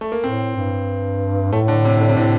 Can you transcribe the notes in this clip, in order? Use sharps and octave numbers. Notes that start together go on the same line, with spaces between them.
A3
A#3
A2 C4
G2
A2 A3
D3
C3
D3
C3
A2 D3